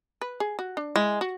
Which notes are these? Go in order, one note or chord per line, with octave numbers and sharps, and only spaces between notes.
B4
G#4
F#4
D4
G#3 E4
F#4